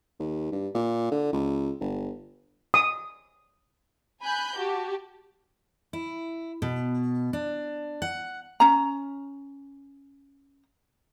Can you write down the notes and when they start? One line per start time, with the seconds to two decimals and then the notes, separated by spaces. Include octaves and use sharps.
0.19 D#2
0.52 G2
0.74 A#2
1.11 D3
1.33 C#2
1.81 G1
2.74 D#6
4.22 G#5 B5 F#6 G6
4.58 F#4 G4 A5
5.93 E4
6.62 B2
7.33 D4
8.02 F#5
8.60 C#4 A#5